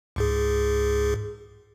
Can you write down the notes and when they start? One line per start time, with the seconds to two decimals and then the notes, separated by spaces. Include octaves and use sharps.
0.16 C#2 G#2 G#4